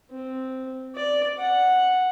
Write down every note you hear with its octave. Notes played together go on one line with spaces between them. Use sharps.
C4
D5
F#5